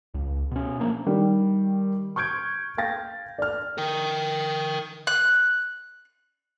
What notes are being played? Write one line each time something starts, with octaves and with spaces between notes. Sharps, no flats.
C#2
B2 C#4
F3 A3 A#3 D4
D#3 G3
C#6 F6 G6 G#6 D7
F5 G5 A6 A#6
D5 F6
A#4 G5
F#6